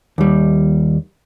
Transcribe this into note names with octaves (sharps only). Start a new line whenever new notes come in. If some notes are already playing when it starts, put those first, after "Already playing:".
D#2 G3